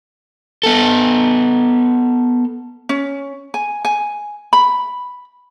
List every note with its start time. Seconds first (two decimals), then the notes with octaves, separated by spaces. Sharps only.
0.63 B3 A4
2.89 C#4
3.54 G#5
3.85 G#5
4.53 B5